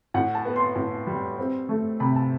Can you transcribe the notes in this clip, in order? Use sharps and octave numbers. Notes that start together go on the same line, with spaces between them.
A2 F#5
A5
B3
C6
A2
G3
C4
A3
C3 B5
A5